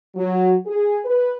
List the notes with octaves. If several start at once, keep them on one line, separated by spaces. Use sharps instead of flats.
F#3
G#4
B4